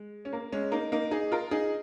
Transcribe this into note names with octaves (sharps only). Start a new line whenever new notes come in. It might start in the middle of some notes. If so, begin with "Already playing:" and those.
Already playing: G#3
C#4
A#3
G#3 C#4
A#3 D#4
A#3 D#4
D#4 G#4
F4 A#4
D#4 G#4